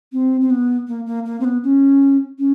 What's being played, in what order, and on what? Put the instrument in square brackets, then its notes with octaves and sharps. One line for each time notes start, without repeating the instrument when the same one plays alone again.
[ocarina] C4
C4
B3
A#3
A#3
A#3
C4
B3
C#4
C#4